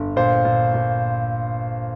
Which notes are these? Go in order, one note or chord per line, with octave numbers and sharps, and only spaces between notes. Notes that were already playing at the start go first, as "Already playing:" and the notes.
Already playing: G1
A#2 C5
A#2
A#2